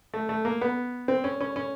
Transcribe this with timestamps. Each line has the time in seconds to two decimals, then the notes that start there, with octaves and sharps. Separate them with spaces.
0.14 A3
0.29 A3
0.45 A#3
0.61 B3
1.08 C4
1.24 C#4
1.41 C#4
1.56 C#4